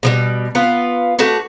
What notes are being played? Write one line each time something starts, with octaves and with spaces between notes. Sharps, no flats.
B2 F3 G3
B3 F4 B4
A3 D4 F#4 B4